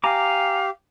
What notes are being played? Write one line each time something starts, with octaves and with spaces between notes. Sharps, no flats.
G4 F5 G#5 A#5 D6